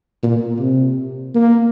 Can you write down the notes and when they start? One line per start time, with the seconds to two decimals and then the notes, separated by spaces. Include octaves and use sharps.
0.23 A#2
0.59 C3
1.35 A#3